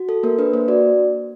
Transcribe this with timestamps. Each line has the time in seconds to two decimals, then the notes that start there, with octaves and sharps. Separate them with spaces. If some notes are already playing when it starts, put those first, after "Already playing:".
Already playing: F#4
0.09 A4
0.23 A#3 A#4
0.38 D4 B4
0.53 A#3 C5
0.68 F#4 D5